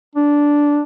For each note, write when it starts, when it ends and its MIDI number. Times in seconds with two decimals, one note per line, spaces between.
0.16 0.81 62